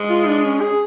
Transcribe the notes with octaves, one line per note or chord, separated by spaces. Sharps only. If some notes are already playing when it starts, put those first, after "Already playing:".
Already playing: G#3
F4
D4
C#4
G#4